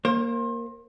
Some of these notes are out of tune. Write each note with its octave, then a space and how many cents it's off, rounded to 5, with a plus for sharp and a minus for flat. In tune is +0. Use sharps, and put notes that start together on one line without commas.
A#3 +0 C5 +35